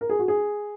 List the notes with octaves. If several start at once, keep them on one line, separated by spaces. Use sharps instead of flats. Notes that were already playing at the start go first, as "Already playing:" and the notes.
A#4
G#4
F#4
G#4